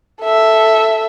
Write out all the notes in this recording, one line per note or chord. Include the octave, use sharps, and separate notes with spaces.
A4 E5